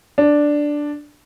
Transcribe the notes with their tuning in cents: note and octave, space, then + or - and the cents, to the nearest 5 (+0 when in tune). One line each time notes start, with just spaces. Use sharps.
D4 +0